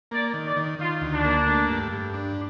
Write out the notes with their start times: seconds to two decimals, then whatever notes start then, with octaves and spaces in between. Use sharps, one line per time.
0.11 A#3 D5
0.34 D#3
0.45 D5
0.57 D#3
0.79 D#3 F4
1.01 D2
1.13 D4
1.24 A#3
1.47 A3
1.69 G2
1.91 G2
2.14 D4